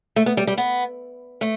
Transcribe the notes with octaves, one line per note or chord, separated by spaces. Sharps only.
A3
B3
G3
G3
B3
A3